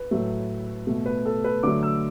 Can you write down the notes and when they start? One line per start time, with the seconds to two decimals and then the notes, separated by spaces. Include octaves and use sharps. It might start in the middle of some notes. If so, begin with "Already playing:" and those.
Already playing: B4
0.11 A2 F#3 A3
0.87 B2 A3
1.06 B4
1.26 A4
1.44 B4
1.63 D3 F#3 A3 D6
1.83 E6